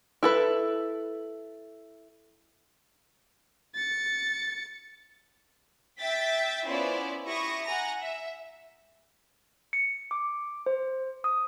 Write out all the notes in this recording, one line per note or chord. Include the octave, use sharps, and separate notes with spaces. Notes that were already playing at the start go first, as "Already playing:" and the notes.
E4 A4 B4
A6 C#7
E5 G5 G6 A6 B6
B3 C#4 E4 F4 C5 D5
E4 G4 C#6 D#6 A#6
F#5 G#5 A#5 A#6
E5
C#7
D6
C5
D#6